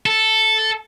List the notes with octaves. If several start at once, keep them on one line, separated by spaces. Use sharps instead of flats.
A4